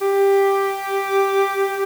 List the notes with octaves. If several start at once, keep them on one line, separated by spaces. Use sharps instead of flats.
G4